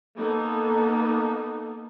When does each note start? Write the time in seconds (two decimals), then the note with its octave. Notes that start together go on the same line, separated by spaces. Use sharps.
0.16 A#3 B3 D#4 A4